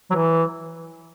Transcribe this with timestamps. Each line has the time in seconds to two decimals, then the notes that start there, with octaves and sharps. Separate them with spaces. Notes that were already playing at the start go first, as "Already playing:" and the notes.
0.11 F#3
0.15 E3